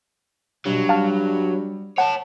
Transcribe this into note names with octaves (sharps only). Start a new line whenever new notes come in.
G2 B2 F#3
G3 F5 A5 F6
C#5 F#5 A5